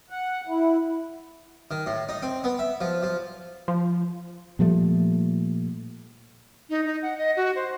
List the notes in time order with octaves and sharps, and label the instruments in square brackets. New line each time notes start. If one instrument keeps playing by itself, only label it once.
[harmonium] F#5
E4
[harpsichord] D#3
A2
D#4
C4
B3
E5
F3
F3
[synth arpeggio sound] F3
[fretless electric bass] A#2 F3 G3 A3
[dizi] D#4
D#4
F#5
D#5
F#4
C5